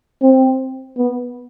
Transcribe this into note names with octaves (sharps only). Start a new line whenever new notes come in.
C4
B3